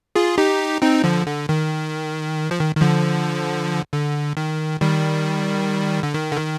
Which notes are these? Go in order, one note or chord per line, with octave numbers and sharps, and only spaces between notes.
F4 G#4
D#4 G4
C4 D#4
D3 F3
D3
D#3
F3
D#3
D#3
D3 F3
D3
D#3
D#3 G3
D3
D#3
D3
D#3